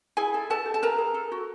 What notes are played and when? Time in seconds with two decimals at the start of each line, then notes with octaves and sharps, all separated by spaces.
0.17 E4 G#4 G#5
0.34 A4
0.50 A4 B4 A5
0.66 G4
0.74 A5
0.82 A#4 B4 A#5
0.98 G#4
1.14 A4
1.32 F#4